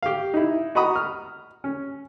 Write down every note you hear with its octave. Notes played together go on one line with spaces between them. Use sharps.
G4 F5
D#4 E4
F#4 D#5 F#5 A#5 B5 D#6
F6
C#4